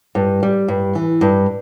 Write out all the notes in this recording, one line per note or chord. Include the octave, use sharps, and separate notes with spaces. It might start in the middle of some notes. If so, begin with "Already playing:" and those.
G2
G3
G2
E3
G2